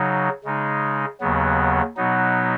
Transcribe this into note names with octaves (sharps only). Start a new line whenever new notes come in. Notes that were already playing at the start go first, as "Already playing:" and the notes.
Already playing: C#3 F#3 D#4
C#3 G#3 D#4
D#2 C#3 F#3 B3
B2 F#3 B3 D#4